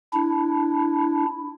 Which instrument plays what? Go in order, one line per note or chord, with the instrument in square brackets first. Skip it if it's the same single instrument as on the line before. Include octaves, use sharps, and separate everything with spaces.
[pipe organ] D4 E4